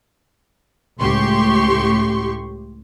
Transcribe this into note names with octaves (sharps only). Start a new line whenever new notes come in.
C#2 A2 G4 C6 C#6